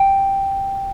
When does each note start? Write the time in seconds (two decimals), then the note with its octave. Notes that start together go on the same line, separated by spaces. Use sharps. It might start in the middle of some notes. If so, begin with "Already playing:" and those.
Already playing: G5